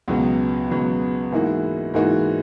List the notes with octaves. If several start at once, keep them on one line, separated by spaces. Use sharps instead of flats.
C#2 B2 F#3 B3
C#2 B2 F#3 B3
G#2 E3 A#3 D#4 F#4
G#2 E3 A#3 D#4 F#4